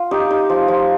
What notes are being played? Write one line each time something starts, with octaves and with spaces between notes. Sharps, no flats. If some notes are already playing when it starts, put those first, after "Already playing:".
Already playing: F4
D#4 G4
D#4
F3
F3